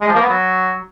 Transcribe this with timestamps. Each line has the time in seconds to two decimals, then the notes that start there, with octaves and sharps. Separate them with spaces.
0.01 G#3
0.08 F3
0.15 A#3
0.22 B3
0.29 F#3